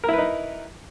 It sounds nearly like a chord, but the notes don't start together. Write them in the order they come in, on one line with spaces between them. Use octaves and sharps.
A#4 E4 B4 D#4